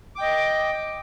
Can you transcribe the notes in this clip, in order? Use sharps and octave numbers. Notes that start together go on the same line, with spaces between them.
D#5 G5 D6